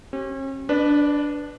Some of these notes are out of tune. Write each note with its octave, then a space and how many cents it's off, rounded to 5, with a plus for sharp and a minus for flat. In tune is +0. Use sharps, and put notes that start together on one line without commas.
C#4 -40 G4 -30
D4 -10 B4 +0 D5 +45